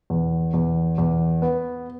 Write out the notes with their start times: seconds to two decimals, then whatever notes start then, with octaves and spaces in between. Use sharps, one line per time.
0.10 E2
0.54 E2
0.98 E2
1.42 B3